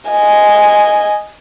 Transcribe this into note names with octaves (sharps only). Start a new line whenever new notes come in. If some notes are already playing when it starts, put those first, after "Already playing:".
D#5 G#5